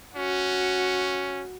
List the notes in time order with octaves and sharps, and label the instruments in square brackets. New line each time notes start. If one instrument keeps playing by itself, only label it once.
[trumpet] C#4 [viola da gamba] F#4